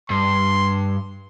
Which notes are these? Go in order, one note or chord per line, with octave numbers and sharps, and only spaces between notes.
G2 C6